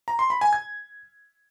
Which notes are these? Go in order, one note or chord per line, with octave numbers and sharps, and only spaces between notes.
A#5
C6
B5
G#5
G#6